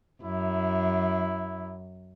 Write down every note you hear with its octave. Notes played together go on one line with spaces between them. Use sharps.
F#2 E4